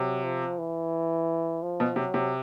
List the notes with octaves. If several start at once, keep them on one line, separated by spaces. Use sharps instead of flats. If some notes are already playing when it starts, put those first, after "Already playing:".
Already playing: C3 F#3
F3
E3
F3
B2
C3 F#3
C3